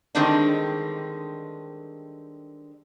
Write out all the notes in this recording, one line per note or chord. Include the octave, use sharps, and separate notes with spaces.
D3 D#3 G3 G#3 C4 D4